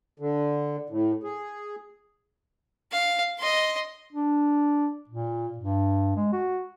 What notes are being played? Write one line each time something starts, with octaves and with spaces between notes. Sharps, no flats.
D3
A2
G#4
F5
D#5 C6
D4
A#2
G2
G#3
F#4